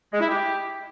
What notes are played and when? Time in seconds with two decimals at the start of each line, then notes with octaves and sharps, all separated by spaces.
0.12 G#3
0.21 E4
0.29 G4